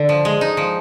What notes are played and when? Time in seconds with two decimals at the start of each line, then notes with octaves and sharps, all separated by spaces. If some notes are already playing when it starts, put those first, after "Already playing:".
Already playing: D3
0.09 F3
0.25 G#3
0.41 D#4
0.57 F3